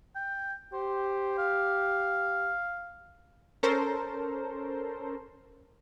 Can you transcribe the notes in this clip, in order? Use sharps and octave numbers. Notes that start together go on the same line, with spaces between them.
G5
G4 C5
F5
C#4 A4 A#4 C5